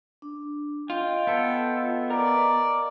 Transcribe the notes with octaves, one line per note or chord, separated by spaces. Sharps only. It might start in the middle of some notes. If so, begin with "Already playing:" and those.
D4
F4 D#5 F5 G5
B3 A4
A#4 D5